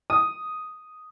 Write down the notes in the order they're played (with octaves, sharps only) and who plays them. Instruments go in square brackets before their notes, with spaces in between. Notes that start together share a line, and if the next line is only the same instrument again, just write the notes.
[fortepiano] D#6